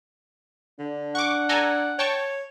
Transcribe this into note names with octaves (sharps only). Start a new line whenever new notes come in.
D3 D4
F#5 C#6 D6
A4 D5 G#5 A#5
C#5 G5 A5 C#6